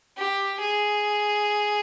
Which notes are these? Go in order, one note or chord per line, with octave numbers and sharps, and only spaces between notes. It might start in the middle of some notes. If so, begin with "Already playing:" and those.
G4
G#4